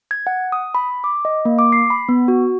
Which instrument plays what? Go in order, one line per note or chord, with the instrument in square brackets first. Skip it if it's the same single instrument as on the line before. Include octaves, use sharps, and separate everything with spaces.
[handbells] G#6
F#5
D#6
B5
D6
D#5
A#3
D6
C7
B5
B3
F#4